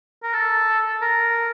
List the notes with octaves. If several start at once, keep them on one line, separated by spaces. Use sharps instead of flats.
A#4
A4
A#4